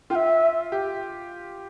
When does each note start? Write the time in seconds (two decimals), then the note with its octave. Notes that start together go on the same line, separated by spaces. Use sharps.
0.10 F4 G5
0.15 E5
0.72 G4